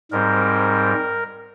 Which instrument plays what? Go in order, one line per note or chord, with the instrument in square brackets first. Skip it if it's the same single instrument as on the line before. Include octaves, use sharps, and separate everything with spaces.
[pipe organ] G#2 G3 C4 A#4